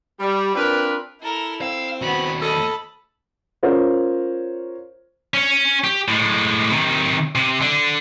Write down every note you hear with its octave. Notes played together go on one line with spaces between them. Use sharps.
G3
C4 D4 F4 A#4 B4
E4 A4 A#4
C4 F5 E6
D#2 B3 F#4 C#5 B5
A4 D#5 A5 B5
C#4 F4 A#4 C5 C#5
C#4 C#5
G4
A2 G#3
C3 D#3
C3
D3